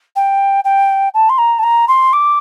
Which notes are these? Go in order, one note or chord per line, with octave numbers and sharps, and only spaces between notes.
G5
G5
A5
C6
A#5
A5
A#5
C6
D6